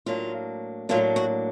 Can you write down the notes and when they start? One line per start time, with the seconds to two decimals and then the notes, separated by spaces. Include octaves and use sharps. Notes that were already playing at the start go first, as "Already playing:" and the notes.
0.06 A2 F#3 A#3 D4 F4
0.89 A2 F#3 A#3 D4 F4
1.16 F#4